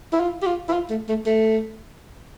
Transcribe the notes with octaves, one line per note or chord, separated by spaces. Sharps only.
E4
F4
G4
F4
E4
F4
A3
A3
A3